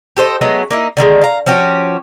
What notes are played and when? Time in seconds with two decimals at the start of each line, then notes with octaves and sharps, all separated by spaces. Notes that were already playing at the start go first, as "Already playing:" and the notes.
0.17 G4 A4 C5 D#5
0.41 F#3 G#3 A3 B3
0.71 A#3 D#4 E4
0.97 D3 D#3 G3 G#3
1.22 F5 A#5
1.46 F3 C#4 F#4 G4